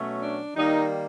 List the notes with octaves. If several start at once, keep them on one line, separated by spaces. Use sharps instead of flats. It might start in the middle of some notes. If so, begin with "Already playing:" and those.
Already playing: B2 F#3 A3 C#4
D4
D#3 G3 A#3 D#4